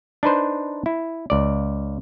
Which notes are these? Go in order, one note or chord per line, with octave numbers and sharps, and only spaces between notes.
D4 D#4 B4 C5
E4
C#2 D5